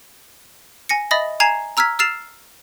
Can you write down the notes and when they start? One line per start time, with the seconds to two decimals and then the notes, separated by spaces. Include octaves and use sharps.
0.89 G#5 A#6 C#7
1.11 D#5 E5 B5 D#6 A6 A#6
1.40 G#5 A#5 G#6 C7 E7
1.77 A#5 E6 F6 G#6 B6
1.99 E6 F6 A6 C7 E7 F7